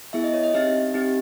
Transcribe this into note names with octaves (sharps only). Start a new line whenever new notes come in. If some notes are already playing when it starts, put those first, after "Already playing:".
B3 E4 G#4 E5
D#5
C#5
D#5
C4 D#4 G4 E5
C4 D#4 G4